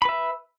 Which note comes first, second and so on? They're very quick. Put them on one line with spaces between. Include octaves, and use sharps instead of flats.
B5 B4 E5